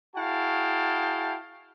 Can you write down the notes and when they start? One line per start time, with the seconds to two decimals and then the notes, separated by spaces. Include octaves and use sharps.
0.16 E4 F#4 G#4 F5 G5 A5